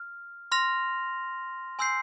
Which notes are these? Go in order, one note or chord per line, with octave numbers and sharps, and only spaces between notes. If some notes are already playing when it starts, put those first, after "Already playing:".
Already playing: F6
C6 F6 A#6 F7
G#5 C6 E6 G6 C7